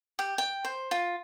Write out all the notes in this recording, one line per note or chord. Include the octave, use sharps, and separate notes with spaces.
G4
G5
C5
F4